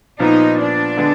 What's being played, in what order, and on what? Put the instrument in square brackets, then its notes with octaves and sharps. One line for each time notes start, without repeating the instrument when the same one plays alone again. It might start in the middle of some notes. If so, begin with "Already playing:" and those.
[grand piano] A#2 F3 B3 [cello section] D#4
[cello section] D4
[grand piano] D3 G#3 B3